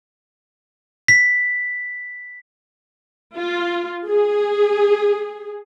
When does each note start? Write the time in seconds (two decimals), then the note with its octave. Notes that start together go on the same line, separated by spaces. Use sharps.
1.08 B6
3.35 F4
4.07 G#4